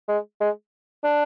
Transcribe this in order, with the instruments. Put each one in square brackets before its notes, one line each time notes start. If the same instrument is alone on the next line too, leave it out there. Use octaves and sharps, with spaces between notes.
[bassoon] G#3
G#3
D4